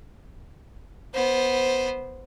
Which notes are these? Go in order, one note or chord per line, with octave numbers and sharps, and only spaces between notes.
B3 C5